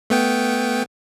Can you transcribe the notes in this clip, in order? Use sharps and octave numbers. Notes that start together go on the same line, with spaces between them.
A3 B3 G5